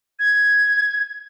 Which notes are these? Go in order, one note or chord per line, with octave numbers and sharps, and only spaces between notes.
G#6